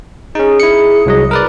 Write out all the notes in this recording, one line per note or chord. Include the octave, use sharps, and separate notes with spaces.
C#4 D#4 G#4
E4 C#7
C2 F#3 D#5
A#4 B4 D5